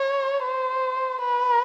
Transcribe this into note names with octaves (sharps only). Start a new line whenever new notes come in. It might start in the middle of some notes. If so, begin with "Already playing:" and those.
Already playing: C#5
C5
B4